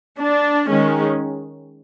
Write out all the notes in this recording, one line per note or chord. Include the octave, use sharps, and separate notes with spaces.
D4
D#3 G#3 C#4